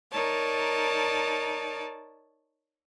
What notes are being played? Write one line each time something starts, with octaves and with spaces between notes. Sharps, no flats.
D#4 A#4 C#5 D5 A5